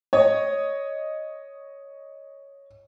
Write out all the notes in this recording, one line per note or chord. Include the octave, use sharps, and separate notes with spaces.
C#5 D#5